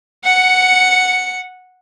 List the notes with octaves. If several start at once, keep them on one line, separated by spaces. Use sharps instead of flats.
F#5 C#7